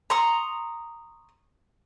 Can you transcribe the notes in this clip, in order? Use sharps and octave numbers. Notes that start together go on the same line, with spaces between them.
A#5 C6 C#6 D#6